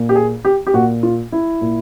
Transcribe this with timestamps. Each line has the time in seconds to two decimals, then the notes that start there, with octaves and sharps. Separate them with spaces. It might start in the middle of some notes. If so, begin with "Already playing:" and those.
Already playing: A#2
0.09 G4
0.15 G#4
0.45 G4
0.67 G4
0.73 A#2 F#4
1.03 F4
1.32 E4
1.61 A#2